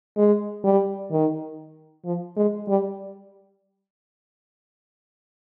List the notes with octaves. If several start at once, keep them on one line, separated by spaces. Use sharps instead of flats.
G#3
G3
D#3
F3
G#3
G3